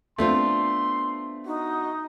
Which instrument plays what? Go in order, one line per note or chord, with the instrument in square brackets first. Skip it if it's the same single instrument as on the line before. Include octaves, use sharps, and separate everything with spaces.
[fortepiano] A3 C4 [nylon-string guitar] B3 D4 F4 [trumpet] C6
[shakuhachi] D#4 [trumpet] F#4